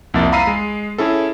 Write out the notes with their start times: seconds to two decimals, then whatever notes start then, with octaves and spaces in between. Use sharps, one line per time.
0.14 C2 F2 A#3 E5 A6
0.32 F5 A#5 B5 E6 C7 D#7
0.47 G#3
0.98 C#4 E4 G#4 A4